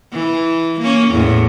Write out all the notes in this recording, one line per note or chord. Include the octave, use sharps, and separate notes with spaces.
E3
A#3 C#4
E2 A2